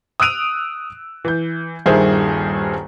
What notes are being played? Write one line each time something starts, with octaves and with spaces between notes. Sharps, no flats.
D#6 E6 F#6 D7 D#7 F7
E3 G6
D#1 G2 D#3 G#4 C5 E5